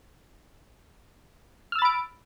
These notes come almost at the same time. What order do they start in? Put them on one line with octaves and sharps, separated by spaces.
F6 E6 A6 B5 D7